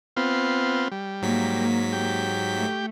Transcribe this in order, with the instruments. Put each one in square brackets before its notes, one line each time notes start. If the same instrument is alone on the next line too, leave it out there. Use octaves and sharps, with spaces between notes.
[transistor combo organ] B3 C4 F4
G3
[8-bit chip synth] G#2 F#3 B6 [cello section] A#3
[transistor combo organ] G4
[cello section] A3